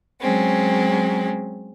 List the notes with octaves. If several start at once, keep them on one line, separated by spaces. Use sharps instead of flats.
F#3 G#3 C4 C#4